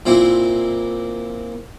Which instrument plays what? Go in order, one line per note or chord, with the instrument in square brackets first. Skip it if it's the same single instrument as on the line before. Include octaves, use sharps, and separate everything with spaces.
[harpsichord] A#2 C4 E4